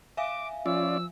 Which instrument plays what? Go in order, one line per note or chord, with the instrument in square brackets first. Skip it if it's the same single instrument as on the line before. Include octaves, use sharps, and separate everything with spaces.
[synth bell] E5 F5 G#5 [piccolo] D6
[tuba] F3 [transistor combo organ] C#4 F4 D5 [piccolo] E6